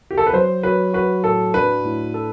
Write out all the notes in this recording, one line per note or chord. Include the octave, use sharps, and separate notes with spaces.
G4
A4
B4
F#3 C5
F#3 B4
F#4 B4
A2 A4
D4 B4
A2
A4